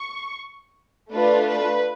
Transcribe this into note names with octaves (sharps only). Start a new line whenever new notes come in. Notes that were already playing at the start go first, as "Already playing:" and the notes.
Already playing: C#6
A3 D4 F4 B4
B4